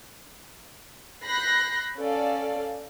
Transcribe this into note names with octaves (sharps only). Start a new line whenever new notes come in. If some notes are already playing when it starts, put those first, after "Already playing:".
B5 F#6 G6 A#6 C7
C#4 A4 D5 F5